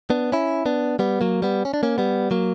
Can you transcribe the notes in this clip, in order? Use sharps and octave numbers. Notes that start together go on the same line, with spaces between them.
B3 D4
C#4 E4
B3 D4
G3 B3
F#3 A#3
G3 B3
C#4
D4
A#3 C#4
G3 B3
F#3 A#3